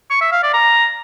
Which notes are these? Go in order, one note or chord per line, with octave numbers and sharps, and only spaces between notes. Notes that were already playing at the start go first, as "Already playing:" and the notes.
C#6
E5
F5
D5
A#5